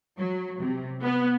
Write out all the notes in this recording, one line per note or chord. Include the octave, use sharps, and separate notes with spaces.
F#3
C3
B3